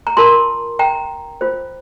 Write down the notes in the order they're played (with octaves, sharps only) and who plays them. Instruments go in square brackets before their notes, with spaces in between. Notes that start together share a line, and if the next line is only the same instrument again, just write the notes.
[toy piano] A#5
F4 A#4 A5 C6
G5 A#5
F4 C5